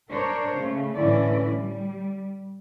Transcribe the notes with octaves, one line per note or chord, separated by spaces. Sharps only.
D4 A#4 C5 C#5
C#3 A3
A2 D3 E3 C#4 E4 D5
G3